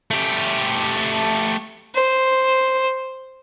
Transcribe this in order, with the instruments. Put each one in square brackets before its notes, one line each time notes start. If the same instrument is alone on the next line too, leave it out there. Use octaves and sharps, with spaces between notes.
[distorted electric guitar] A3 G4
[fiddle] C5